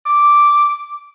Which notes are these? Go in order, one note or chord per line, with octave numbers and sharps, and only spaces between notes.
D6